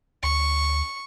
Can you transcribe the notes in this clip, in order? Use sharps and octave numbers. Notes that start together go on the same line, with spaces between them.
D2 C#6